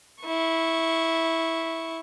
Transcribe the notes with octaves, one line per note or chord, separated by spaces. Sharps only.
E4 C#6